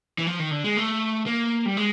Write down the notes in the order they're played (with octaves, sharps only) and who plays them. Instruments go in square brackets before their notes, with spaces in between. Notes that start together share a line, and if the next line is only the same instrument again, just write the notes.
[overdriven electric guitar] E3
F3
D#3
D3
G#3
A3
A#3
G3
G#3